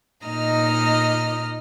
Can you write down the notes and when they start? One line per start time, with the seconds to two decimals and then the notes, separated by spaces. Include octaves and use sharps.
0.24 A#2 D#4 D#5 A#5 F6